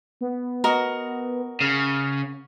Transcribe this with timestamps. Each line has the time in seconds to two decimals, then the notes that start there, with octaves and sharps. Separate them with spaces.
0.21 B3
0.64 F#4 A#4 D#5
1.61 C#3 F6